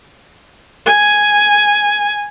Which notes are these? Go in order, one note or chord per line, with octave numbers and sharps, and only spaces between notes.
G#5